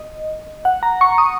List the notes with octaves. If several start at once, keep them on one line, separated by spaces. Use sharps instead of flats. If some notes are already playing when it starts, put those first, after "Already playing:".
Already playing: D#5
F#5
A#5
C#6
D#6